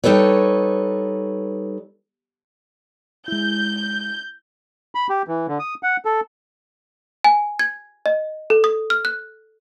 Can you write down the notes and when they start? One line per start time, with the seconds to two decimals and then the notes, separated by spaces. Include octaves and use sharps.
0.04 G3 D#4 A4 B4 C#5
3.28 G#3 E4 G6
4.95 B5
5.09 G4
5.28 E3
5.48 D3
5.59 D#6
5.83 F#5
6.05 A4
7.24 G#5
7.59 G#6
8.06 D#5
8.50 A4
8.64 D#6
8.90 F6
9.05 F#6